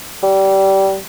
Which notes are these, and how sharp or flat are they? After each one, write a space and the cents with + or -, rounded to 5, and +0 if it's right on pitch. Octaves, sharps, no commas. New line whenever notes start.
G3 -20